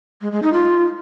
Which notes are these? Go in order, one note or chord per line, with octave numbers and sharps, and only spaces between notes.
G#3
G#3
D#4
F4